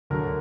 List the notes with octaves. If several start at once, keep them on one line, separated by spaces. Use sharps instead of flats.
D2 D3 F#3 A#4